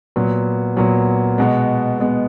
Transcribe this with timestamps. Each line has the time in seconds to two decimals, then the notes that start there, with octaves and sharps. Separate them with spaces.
0.16 A#2 F#3 B3
0.77 A#2 F#3 B3
1.38 B2 G#3 B3
1.99 B2 G#3 B3